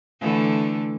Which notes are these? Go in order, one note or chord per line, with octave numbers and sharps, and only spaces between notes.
D3 E3 A3